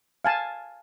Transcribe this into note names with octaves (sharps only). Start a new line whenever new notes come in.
F5 G#5 A5